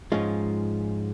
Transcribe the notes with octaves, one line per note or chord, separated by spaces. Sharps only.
G#2 F3 G#3 C#4 F4